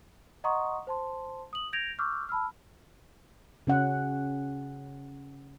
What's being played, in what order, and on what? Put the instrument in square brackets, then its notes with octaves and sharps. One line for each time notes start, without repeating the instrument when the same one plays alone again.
[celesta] D#5 F#5 A#5 C6 C#6 D#6
C5 A5 C6
D#6 F#7
G6 G#6 A#6 D7 F7
C#6 D6 E6 F6 G6
A5 B5 E6 F6
[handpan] C#3 C#4 F#5